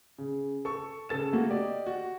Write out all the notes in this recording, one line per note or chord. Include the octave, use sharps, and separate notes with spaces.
C#3
A4 C#6
C#3 A4 A6 E7
A3 A#3 F#4
G4 D5 D#5
F#4